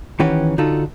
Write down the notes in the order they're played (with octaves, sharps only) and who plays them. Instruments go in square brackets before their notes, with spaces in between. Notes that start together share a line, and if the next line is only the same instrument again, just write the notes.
[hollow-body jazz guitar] D#3 E3 C#4 G4 B4 F#5
D3 D#4 F4 F#4 A4